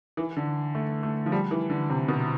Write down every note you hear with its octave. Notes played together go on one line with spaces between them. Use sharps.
E3
D3
A3
A3
F3
G3
E3
D3
C3
B2